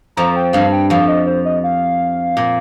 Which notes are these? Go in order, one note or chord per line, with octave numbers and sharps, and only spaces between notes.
F2 F3 A#5
G5
G2 G3 F5
G5
F2 F3 F5
D#5
C5
D#5
F5
A#2